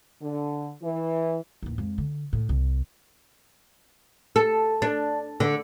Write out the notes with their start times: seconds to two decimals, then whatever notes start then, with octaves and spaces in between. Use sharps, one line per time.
0.22 D3
0.83 E3
1.63 A1 D#2
1.78 F2 G#3
1.98 D3
2.33 A2
2.49 C2
4.36 A4
4.82 D4
5.40 D3